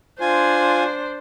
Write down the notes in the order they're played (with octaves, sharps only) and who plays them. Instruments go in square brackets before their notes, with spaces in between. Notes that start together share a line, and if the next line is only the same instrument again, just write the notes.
[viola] D4 C5 [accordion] F4 G#5